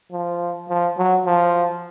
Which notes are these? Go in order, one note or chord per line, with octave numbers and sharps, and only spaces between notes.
F3
F3
F#3
F3